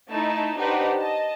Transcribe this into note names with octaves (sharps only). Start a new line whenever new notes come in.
A3 D#4 E4 A5
D4 D#4 G4 B4 C5 F#5
D#5 A5